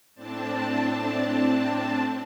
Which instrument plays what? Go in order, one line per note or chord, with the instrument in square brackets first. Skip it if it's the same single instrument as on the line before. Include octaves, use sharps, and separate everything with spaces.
[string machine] A2 C4 D4 A5